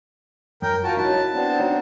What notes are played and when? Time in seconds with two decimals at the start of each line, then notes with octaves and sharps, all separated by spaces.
0.62 F#2 A#4 G5
0.84 D2 F4 F#4 A#4 A5
0.97 F#3 D#4 E4 F#4 A5
1.32 B3 C4 D4
1.60 D#4 C#5 D5